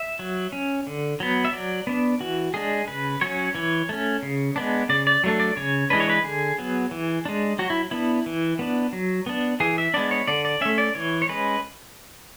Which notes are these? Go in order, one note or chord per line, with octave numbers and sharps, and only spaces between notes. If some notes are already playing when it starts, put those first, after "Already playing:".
Already playing: E5
F#3
C#4
D3
F#3 B3
E5
F#3 D5
B3 D4
E3 F#4
G#3 D4 G#4
C#3 B4
F#3 C#4 C#5
E3 C#5
A3 C#4
C#3
G#3 B3 D4
C#3 D5
D5
F#3 A3 D4
D5
C#3 C#5
E3 G#3 D4 B4
C#5
B4
D3 G#4
F#3 B3
E3
G#3 D4
F#3 F#4
E4
B3 D4 E4
E3
B3 D4
F#3
B3 D4
E3 G#4
E5
G#3 B3 D4 D5
C#5
D3 D5
D5
A3 C#4 E5
D5
E3 C#5
C#5
G#3 C#4 B4